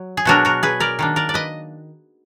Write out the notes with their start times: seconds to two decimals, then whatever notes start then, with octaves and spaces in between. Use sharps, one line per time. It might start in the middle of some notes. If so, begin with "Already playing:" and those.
Already playing: F#3
0.17 G#4
0.25 B2 F#3 D4 F#4 A#4
0.45 F#4 A#4
0.63 G#4 B4
0.80 A#4 D5
0.99 D#3 A#3 D4
1.16 A#4 D5
1.29 D5
1.34 B4 D#5